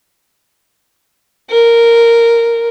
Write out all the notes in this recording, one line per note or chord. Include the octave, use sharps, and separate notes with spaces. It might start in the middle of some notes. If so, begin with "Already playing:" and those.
A#4